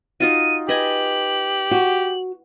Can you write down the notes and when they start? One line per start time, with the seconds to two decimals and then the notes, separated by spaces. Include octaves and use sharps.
0.20 D#4 F4 F#4 D#7
0.69 G4 B4 D#5 G#5 F#7
1.71 F#4